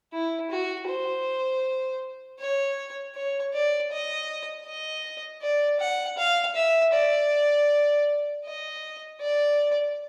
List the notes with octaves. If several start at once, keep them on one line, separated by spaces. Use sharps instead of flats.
E4
F#4
C5
C#5
C#5
D5
D#5
D#5
D5
F#5
F5
E5
D5
D#5
D5